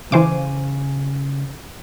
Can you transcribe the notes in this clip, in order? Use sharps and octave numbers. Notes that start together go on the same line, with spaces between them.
C#3 E3 C5 F5 G#5 D6